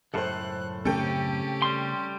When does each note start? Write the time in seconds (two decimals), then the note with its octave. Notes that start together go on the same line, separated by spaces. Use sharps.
0.14 C#2 F#2 A2 A4 C5 F#6
0.85 C#3 A3 C4 C#4 G4 A4 G5
1.62 G3 C6